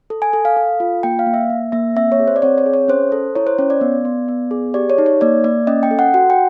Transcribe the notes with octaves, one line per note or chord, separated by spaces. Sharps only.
A4
G#5
A4
F5
A4
F4
A#3 G5
F5
A#3
E5
A#3
A#3 E5
C4 E5
C#5
G#4
C5
D5
C4 C#5
C#5
G#4
C#5
C#4 C5
A4
E4 C#5
C5
C#4 C#5
D5
B3
B3
B3
G#4
G4 D5
C#5
D#4
C#5
A#3 D5
A#3 D5
C#4 D#5
G5
A4
F#5
F#4 F#5
G5